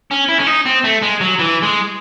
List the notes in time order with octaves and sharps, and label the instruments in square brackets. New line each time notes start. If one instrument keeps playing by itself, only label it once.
[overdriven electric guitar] C#4
E4
C#4
D#4
C4
A3
G#3
F#3
E3
G#3